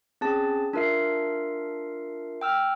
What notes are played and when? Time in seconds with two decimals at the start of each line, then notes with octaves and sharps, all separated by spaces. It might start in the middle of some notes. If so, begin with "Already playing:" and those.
0.21 C4 C#4 G#4 A5 A6
0.73 D4 F4 A#4 E5 C7
2.41 G5 E6 F6